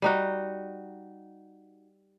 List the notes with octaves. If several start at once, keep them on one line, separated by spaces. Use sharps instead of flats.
G3 D#4 F#4